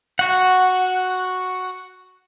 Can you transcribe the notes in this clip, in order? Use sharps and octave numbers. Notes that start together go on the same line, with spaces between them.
F#4 F#5